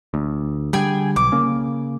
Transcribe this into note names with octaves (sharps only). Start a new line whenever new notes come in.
D2
D3 G3 G#4 G5 G#5
B1 D6
C#3 A#3